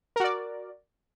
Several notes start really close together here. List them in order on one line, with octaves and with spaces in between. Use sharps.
A#4 F#4 D5